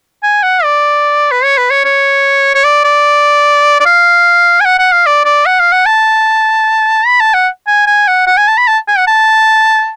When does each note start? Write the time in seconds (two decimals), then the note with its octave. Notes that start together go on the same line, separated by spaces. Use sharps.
0.23 G#5
0.43 F#5
0.64 D5
1.31 B4
1.44 C#5
1.58 B4
1.70 C#5
1.84 C#5
2.55 C#5
2.64 D5
2.84 D5
3.80 D5
3.86 F5
4.61 G#5
4.65 F#5
4.79 F#5
4.92 F5
5.06 D5
5.25 D5
5.46 F#5
5.60 F5
5.72 F#5
5.86 A5
7.06 B5
7.20 A5
7.34 F#5
7.67 G#5
7.87 G#5
8.07 F#5
8.27 F#5
8.37 G#5
8.48 A5
8.58 B5
8.67 A5
8.88 G#5
8.97 F#5
9.07 A5